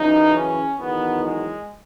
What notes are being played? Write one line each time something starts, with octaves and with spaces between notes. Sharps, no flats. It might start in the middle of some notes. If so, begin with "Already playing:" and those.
Already playing: F#2 C#3 E3 D#4
C#4
E2 D#3 F#3 B3
G#3